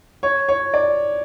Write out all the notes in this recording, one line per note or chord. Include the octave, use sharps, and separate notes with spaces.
C#5
C#5
D5